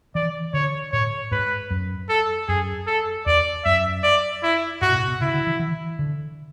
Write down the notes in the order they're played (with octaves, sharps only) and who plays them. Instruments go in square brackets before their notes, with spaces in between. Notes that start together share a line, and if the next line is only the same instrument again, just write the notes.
[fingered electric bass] E3 [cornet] D5
[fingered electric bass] D3 [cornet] C#5
[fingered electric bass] A2 [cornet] C#5
[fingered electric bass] G#2 [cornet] B4
[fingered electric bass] F#2
[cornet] A4
[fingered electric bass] F#2 [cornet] G#4
[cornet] A4
[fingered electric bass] E2 [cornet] D5
[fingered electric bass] F#2 [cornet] E5
[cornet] D5
E4
[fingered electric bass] G#2 [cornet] F#4
[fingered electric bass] B2
A2
B2
[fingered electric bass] C#3 [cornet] E4
[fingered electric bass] D3
E3
E3
D3